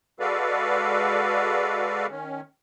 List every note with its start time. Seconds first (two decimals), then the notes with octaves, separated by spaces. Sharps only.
0.20 G#3 F#4 A4 B4 D5 F5
2.10 D#3 C#4